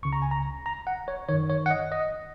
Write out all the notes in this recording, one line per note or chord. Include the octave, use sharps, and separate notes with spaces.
C#2 C#3 C#6
A#5
G#5
A#5
A#5
F#5
C#5
F#2 D#3 C#5
C#5
F#5
D#5
D#5